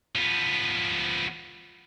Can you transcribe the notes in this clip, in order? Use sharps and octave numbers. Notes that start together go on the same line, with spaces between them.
F3 B3